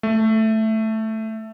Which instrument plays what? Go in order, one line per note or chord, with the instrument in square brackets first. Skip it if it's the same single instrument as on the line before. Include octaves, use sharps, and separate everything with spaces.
[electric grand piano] A3